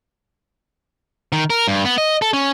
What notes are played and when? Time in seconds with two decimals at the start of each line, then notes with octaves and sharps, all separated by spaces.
1.32 D#3
1.50 A#4
1.68 G2
1.85 B3
1.98 D#5
2.22 A4
2.33 C#4